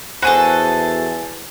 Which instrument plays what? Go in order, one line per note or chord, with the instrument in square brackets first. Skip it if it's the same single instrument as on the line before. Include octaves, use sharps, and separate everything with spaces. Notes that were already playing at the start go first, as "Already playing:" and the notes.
[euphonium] E2 [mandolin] F#4 G#4 A4 [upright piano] C5 G#5